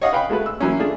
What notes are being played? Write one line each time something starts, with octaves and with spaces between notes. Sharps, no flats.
C#5 D#5 F5 F#5 D#6
B4 F5 G5 G#5 B5
G#3 A3 F#4 B4
E6
E3 F#3 A#3 C#4
A3 D4 F4 G#4